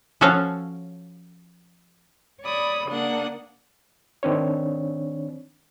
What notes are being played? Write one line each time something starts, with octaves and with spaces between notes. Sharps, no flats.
F3 C#4 F#4 A4 C#5 F5
C#5 D5 B5 D#6
C#3 A#3 D4 F#5 D#6
D#3 C4 D4 C#5